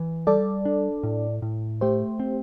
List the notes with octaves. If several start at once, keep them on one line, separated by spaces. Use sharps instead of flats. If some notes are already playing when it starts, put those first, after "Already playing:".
Already playing: E3
G3 A4 D5
D4
A2
A2
A3 G4 C5
C4